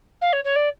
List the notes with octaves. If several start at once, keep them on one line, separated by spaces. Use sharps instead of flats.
F5
C#5
C#5
D5